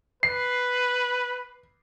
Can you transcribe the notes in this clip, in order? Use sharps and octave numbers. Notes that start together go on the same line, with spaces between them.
B4 C7